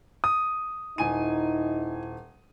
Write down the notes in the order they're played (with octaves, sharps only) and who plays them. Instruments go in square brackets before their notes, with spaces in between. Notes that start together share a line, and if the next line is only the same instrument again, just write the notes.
[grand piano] D#6
[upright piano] D#1 G#5 D#7 [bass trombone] D#4 [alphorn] E4